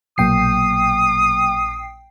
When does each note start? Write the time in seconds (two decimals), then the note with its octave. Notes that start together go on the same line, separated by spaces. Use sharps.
0.18 A#1 B2 F#3 A#3 G5 D#6 C7